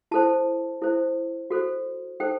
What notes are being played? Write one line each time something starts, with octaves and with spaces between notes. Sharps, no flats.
E4 A4 C5 A5
E4 A4 C5
F#4 A4 C5
D#4 A4 C5 G5